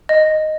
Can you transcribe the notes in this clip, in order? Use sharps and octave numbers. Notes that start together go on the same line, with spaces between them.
D#5